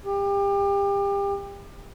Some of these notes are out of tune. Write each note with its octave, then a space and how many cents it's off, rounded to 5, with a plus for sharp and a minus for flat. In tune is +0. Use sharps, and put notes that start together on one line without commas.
G4 +30